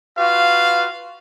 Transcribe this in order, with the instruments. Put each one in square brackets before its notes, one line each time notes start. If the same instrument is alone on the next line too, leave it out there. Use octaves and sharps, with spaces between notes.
[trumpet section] F4 F#4 B4 F5